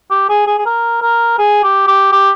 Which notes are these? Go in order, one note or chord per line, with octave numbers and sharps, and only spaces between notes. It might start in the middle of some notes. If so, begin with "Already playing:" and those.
G4
G#4
G#4
G#4
A#4
A#4
G#4
G4
G4
G4